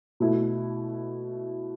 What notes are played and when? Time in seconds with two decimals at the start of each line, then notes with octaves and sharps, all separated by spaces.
0.20 B2 A3 E4